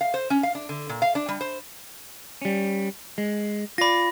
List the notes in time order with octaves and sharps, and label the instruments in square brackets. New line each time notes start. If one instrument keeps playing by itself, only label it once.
[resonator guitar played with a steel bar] F5
C5
C#4
F5
D4
D3
A#2
F5
D4
G3
C5
[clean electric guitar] G3 C#4
G#3
[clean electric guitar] F4 D5 [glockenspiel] B5 A#6